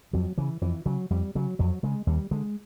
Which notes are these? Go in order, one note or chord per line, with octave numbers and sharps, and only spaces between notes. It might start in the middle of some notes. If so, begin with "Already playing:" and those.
F2 F#3
C#3 E3
F2 E3
C#3 F#3
F2 G3
C#3 F#3
F2 F#3
C#3 G#3
D#2 G3
D3 G#3